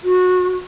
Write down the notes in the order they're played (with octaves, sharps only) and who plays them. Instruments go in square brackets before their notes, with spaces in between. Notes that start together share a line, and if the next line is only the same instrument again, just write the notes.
[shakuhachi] F#4